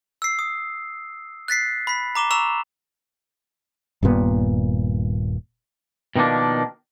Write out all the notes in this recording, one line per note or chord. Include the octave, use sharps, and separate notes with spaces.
E6 C7
D#6
F#6 A6 B6 C7
B5 B6
A#5 D6 E7 G7
A#5 C#6 E6 E7 F7
D#1 G2 A#2 B3
B2 D#3 F3 A#3 D4